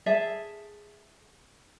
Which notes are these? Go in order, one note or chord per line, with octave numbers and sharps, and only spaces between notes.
G#4 A4 E5